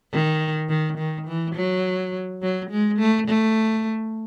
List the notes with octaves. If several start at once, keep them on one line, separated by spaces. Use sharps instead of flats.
D#3
D#3
D#3
E3
F#3
F#3
G#3
A3
A3